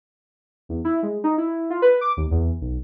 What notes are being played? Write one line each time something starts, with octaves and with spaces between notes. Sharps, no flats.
E2
E4
G#3
D#4
E4
F4
B4
D6
D#2
E2
B1